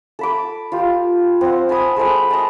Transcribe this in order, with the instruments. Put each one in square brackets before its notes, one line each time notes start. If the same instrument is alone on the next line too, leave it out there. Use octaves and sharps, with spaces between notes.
[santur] A4 B5 D6
F4 G4
C4 F#5
G#5 A5 B5 D#6
G#3 A4 C5 B5
D#5 A5